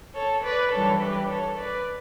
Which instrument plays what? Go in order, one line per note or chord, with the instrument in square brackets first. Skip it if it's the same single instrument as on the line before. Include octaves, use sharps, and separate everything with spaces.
[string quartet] A4 C#5
B4 D5
E3 G3 D4 A4 C#5
G4 B4
A4 C#5
B4 D5